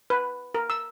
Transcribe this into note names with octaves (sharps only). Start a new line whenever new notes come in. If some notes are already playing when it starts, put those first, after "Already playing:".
B4
A#4
E6